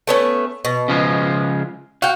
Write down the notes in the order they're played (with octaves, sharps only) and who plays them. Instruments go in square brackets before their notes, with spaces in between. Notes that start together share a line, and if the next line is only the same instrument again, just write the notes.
[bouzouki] A3 B3 C#4
B2
[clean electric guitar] C#3 F3 G#3
[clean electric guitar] F#4 [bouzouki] F5 G5